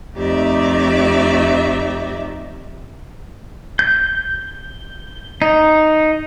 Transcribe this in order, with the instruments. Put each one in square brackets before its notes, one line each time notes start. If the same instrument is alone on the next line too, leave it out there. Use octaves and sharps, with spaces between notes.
[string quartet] F2 A3 D#4 G4 D5 E5
[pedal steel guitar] G6
D#4